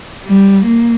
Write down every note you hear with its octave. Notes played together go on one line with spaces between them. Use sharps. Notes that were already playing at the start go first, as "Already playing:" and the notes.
G3
A#3